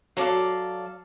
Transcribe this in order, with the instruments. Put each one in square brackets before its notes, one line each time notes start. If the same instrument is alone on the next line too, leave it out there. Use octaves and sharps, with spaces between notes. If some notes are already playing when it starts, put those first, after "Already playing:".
[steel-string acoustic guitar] F#3 A4 D5 F5